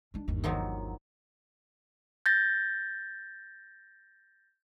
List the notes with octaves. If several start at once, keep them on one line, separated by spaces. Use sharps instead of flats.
G#3 D4
G1 D#2
D#3 F3 F#3
G6 A6 A#6